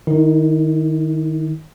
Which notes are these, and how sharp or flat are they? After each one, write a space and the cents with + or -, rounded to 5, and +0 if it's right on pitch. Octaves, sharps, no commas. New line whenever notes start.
D#3 -10 E4 -40